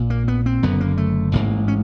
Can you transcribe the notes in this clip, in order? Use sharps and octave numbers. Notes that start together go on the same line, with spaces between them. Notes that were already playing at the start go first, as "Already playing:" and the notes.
Already playing: A#1 A#2
A#3
B3
C4
F#1 F#2 D3 B3
A#3
A3
A1 G#2 A#3
C#4